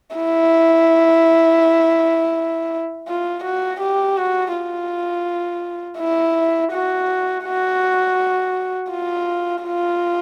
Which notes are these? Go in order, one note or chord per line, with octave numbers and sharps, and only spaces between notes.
E4
F4
F#4
G4
F#4
F4
E4
F#4
F#4
F4
F4